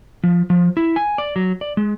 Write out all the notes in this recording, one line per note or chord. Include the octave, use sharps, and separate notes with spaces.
F3
F3
E4
G#5
D5
F#3
D5
G#3